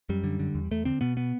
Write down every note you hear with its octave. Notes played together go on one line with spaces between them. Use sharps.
F#2 G3
D3
D3
E2
E2 A3
D3 C4
B2 B3
B3